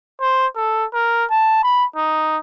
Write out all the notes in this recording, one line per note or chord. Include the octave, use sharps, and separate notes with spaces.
C5
A4
A#4
A5
B5
D#4